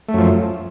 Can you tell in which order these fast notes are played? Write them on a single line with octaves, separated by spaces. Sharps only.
A3 F#2 F3